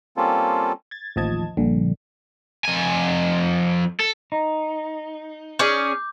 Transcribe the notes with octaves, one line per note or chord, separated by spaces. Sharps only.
G3 A#3 C4 C#4 F4 A4
G#6 A6
A1 D#2 F3 D#5 A5 G#6
A#1 G2 D3
F2 G#5
A4
D#4
C#4 G#4 D5 D6 G6